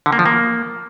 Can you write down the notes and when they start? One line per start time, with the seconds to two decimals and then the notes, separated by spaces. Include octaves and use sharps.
0.06 D3
0.13 A#3
0.19 F3
0.26 A#3